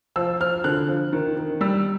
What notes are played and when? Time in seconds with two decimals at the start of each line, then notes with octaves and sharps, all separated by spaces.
0.16 F3 E6
0.40 F3 F6
0.64 D3 F#6
0.89 F3
1.13 D#3
1.37 D#3
1.61 G3 E6